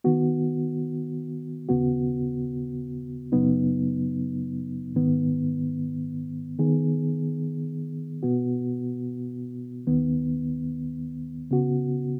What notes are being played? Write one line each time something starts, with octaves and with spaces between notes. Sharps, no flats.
D#3 B3 F#4
D#2 C#3 B3 F#4
F#2 C#3 F#3 B3 D#4
G#2 D#3 B3
D#3 B3 G#4
B2 B3 F#4
D#2 D#3 B3
C#3 B3 F#4